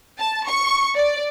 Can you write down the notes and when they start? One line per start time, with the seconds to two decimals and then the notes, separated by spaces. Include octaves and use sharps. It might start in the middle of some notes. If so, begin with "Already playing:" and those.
0.19 A5
0.49 C#6
0.96 D5